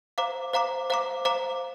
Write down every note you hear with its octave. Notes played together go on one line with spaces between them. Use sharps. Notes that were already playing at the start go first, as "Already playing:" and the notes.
C5 F5 A#5 D6
C5 F5 A#5 D6
C5 F5 A#5 D6
C5 F5 A#5 D6